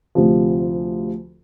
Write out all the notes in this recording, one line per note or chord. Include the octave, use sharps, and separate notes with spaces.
D2 C3 F3